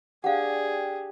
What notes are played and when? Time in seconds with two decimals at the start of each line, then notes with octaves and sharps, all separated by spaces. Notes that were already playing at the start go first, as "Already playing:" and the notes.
0.24 D4 G4 G#4 F5 F#5